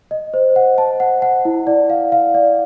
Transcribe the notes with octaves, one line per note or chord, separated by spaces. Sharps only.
D#5
C5
F#5
A5
F#5
F#5
E4
D5
F5
F5
D5